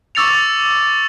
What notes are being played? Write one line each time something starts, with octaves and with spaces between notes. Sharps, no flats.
C#6 D6 E6 A6 C#7 F7